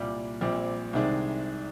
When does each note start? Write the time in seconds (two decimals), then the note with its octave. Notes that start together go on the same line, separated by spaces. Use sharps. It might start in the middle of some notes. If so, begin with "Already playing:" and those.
Already playing: C2 A#2 G3
0.41 A#1 A#2 G3 C4
0.93 C2 C3 D#3 G#3 D4